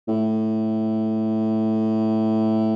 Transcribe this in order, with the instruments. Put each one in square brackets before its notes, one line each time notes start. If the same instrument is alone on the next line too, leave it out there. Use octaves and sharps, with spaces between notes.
[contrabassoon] A2